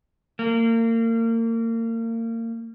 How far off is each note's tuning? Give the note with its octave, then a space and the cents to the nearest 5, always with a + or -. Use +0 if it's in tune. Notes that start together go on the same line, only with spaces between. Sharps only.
A#3 -35